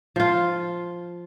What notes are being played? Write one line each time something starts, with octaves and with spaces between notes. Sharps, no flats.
F3 F4